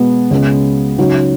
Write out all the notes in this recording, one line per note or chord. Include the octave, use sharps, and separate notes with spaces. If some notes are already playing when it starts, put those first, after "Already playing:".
Already playing: B2 G#3 B3
C#2 C#3 G#3 B3
C#3 F#3 D#4 F#4